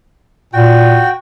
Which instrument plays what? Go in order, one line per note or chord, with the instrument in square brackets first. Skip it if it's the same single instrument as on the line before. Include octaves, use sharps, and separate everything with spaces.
[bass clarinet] A#2 [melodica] F#4 G5